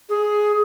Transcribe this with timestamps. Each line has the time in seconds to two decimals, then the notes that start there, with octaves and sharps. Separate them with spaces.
0.09 G#4